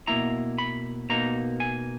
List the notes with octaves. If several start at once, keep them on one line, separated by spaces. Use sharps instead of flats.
B2 A#3 E4 A#5
B5
B2 A#3 D#4 A#5
G#5